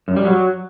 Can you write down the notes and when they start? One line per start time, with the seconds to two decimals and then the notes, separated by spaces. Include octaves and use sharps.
0.08 F#2
0.16 G3
0.25 F#3